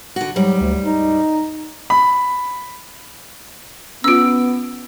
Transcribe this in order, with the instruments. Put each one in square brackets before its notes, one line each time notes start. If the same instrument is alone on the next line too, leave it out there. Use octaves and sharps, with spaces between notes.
[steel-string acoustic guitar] D3 F#4
[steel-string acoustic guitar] G#2 G3 [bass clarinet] F#3
[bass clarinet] D2
D#4
[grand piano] B5
[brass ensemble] B3 [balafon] C#4 F4 [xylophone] E6 D7